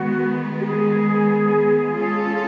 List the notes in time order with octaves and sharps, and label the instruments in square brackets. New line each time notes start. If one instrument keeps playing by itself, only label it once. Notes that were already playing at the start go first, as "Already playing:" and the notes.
Already playing: [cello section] D#3 G#3 B3 [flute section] F#4
[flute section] G4
G#4
[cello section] G#3 C#4 F4 A4